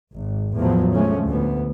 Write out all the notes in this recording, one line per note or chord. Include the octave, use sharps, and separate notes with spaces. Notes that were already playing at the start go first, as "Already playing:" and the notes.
G#1
E2 A2 F3 F#3
D3 F3 G#3 A3 C#4
D2 B3